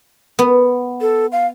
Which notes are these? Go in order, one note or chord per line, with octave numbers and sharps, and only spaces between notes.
B3
A4
F5